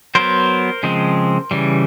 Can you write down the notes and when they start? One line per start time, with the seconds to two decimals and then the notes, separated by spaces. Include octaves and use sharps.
0.15 F#3 B3 A#4 C5
0.83 C#3 F3 G#3 C4
1.51 C#3 E3 G3